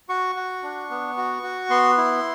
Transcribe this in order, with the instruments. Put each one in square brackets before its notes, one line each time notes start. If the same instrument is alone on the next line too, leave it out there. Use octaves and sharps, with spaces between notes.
[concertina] F#4 C#6
F#4
D4
B3
F#4
F#4
B3 C6
E4